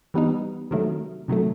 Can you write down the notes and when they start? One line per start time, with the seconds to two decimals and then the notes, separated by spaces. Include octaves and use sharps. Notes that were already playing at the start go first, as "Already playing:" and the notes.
0.14 E3 G3 B3 D#4
0.71 C3 D#3 F#3 A3
1.28 C3 D#3 F#3 A3